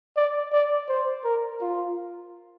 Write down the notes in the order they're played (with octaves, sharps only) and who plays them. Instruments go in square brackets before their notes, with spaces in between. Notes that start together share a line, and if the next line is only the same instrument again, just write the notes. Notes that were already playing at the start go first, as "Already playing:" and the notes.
[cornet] D5
D5
C5
A#4
F4